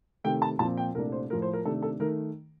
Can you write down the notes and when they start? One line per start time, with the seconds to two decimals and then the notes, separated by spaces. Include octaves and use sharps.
0.24 C3 D#3 A3 G5
0.42 A5
0.59 A#2 F3 C4 A5
0.77 G5
0.95 C2 A#2 A3 D4 A#4
1.12 C5
1.30 A2 F3 A3 A#4
1.42 C5
1.53 A#4
1.65 C3 D#3 A3 D4 A4
1.83 A4
2.00 D#3 A3 A#4